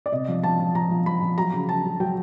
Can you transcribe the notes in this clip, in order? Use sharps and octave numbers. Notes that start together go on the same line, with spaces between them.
D5
C3 D#5
F3
F3 A5
F3
F3 A#5
F3
F3 B5
F3
F#3 A#5
C#3
C#3 A5
F#3
F#3 G5